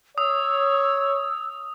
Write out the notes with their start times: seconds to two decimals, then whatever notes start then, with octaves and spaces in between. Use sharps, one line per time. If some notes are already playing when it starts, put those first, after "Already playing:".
0.18 C#5 D#6 E6